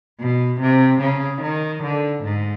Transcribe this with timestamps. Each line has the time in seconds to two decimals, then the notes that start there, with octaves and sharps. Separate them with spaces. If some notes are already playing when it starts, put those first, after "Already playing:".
0.20 B2
0.61 C3
1.01 C#3
1.42 D#3
1.83 D3
2.24 G#2